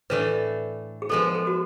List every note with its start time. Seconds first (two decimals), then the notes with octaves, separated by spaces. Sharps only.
0.10 A2 E3 A3 D4 B4
1.02 G#4
1.09 F3 G#3 B3 A4
1.22 A#4
1.35 A4
1.47 F#4